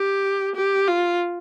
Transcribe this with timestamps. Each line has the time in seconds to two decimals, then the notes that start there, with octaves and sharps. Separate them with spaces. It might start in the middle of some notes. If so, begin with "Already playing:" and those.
Already playing: G4
0.55 G4
0.87 F4